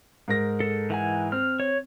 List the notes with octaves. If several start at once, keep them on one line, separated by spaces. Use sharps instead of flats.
G#2 A#4 A#6
A4
E3 F#5 G#5
C4 F6
C#5